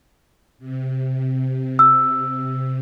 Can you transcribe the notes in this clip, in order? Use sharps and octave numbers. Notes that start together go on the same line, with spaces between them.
C3
E6